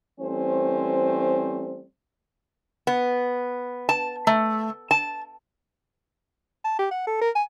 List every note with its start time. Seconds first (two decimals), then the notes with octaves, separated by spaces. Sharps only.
0.20 E3 G3 A3 C4 C#4 C5
2.87 B3
3.89 A5
4.27 A3
4.91 A5
6.64 A5
6.79 G4
6.91 F#5
7.07 A4
7.22 A#4
7.35 G#5